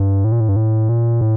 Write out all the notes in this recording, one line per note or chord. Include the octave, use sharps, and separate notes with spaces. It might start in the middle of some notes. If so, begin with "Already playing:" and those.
Already playing: G2
A2
A#2
A2
G2
A2
A#2
A2